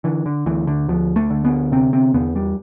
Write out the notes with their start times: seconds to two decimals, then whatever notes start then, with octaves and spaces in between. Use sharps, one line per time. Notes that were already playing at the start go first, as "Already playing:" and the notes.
0.04 D3 E3
0.26 D3
0.46 D2 E3
0.67 D3
0.88 D2 F3
1.16 A3
1.30 D3
1.45 B3
1.72 C3 C4
1.93 C4
2.14 E2 B3
2.36 G3